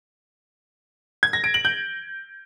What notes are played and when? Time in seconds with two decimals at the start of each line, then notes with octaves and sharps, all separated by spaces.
1.23 G#6
1.33 A#6
1.44 D7
1.54 F#7
1.65 G6